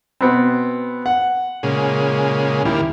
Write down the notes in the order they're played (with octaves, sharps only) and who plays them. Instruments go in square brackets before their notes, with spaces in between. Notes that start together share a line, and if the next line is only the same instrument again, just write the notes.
[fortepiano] B2 B3 C4
F#5
[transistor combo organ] A#2 C#3 G#3
[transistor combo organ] D#2 G3 A#3 [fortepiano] E4